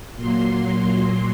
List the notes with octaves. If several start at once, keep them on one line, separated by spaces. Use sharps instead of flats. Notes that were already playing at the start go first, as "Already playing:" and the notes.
A#2 F#3 A#3 C6